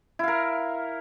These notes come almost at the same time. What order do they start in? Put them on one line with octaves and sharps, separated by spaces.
E4 F5 A#4